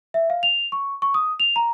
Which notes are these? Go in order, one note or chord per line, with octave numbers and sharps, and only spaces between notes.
E5
F5
F7
C#6
C#6
D#6
F7
A#5